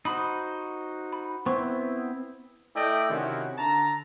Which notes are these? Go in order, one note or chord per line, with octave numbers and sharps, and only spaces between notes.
D#4 F#4 C5 B5 D#6
B5
B3 C4 E4 C5 C6 C#6
A3 E4 D5 D#5 G5
C3 D#3 C#4 E4 F#4
D3 A5 A#5